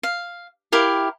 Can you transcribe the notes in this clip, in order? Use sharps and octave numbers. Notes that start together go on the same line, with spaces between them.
F5
E4 G4 A#4 F5